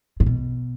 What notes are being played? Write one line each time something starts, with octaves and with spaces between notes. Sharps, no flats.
A#2
B2